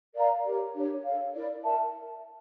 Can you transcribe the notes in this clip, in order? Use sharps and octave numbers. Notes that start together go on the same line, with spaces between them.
A#4 D5 F5 A#5
G4 A#4 C#5
D4 G4 C#5
A4 C#5 F5
E4 A#4 D5
A#4 E5 A5